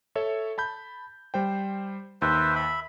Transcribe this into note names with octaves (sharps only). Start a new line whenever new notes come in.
A4 C#5 E5
A5 B5 G6
G3 C5 G5
D#2 B4 C5 E5
E5 B5